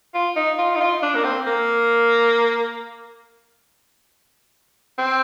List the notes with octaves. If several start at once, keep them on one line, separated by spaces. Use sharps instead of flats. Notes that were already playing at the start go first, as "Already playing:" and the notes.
F4
D#4
F4
D#4
F4
D4
A#3
C4
A#3
C4